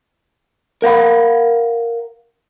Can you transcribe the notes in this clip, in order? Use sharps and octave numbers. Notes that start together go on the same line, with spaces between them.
A#4 F5 F#5 B5